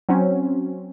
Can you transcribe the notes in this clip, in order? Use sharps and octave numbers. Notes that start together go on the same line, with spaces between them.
F#3 C4 C#4